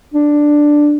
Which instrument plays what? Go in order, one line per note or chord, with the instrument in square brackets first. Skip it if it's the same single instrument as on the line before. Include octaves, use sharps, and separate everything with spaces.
[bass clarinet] D4